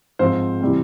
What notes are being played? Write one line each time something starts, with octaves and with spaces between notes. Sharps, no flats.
G#2 F3 C4 C5
C3 E3 G3 C4